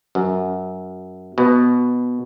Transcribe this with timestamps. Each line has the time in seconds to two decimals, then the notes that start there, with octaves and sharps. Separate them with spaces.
0.15 F#2
1.38 B2